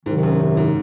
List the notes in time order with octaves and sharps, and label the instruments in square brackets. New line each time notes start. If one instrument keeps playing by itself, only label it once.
[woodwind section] C2 C3 D#3 F#3 [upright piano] G#2
[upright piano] F#2
F#2
G#2